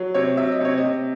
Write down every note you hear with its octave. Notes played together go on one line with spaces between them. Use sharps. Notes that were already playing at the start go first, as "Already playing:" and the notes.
Already playing: F#3
C3 C#5
F#3 E5
D#5
C3 C#5
D#5
C3